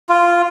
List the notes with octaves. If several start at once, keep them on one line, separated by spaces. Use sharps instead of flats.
F4